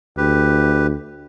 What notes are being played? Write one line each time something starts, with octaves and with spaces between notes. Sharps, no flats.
D2 G4 B4